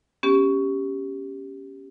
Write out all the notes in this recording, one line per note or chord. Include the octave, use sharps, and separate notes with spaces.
B3 C#4 G4